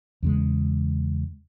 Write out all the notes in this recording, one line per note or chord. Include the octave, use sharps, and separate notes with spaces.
E2 C#3 G#3